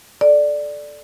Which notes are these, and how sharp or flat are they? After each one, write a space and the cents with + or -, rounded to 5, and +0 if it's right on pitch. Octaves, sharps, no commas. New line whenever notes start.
A4 -15 D5 +5